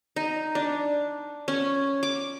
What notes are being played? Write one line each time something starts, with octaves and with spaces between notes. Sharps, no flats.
D#4
D4
C#4
D6